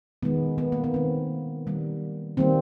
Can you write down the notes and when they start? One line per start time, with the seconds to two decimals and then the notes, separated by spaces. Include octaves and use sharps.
0.23 D#3 G#3 B3
0.58 B3
0.72 A#3
0.84 B3
0.94 D#3 G#3 C4
1.67 D#3 G3 A#3
2.37 D#3 G3 A#3 C4